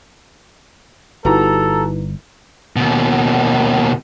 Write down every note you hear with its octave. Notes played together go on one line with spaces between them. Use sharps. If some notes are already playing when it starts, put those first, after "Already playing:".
G1 D#4 E4 F#4 G4 A4 B4 A#5
D#2 B2